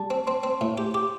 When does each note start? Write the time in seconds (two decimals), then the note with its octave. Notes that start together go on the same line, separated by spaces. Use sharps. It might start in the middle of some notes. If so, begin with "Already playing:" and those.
Already playing: G3 A5
0.10 C4
0.27 C4 C6
0.43 C4
0.61 A2
0.78 G4
0.94 G4 D6